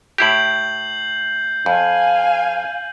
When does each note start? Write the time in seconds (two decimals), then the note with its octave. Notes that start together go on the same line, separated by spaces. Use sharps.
0.18 A2 E4 G4 G6 C7 F#7
1.66 F2 F5 G#5